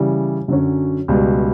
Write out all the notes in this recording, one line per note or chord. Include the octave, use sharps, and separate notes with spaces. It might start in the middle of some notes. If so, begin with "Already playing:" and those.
Already playing: C#3 E3 G3
F#2 D3 F#3 C#4
C#2 B2 G3